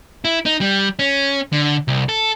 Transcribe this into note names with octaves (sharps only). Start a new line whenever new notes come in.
E4
D#4
G3
C#4
D3
C2
A4